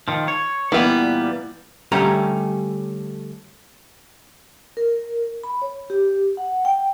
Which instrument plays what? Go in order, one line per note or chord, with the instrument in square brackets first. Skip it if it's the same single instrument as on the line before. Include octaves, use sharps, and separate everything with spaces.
[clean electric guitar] D#3 F3
C#5
[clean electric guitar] A#2 G3 A#3 [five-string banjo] E3 B3
[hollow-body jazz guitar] D3 G3 A3 C#4 G4 A#5
[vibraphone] A#4
B5
C#5
G4
F#5
G5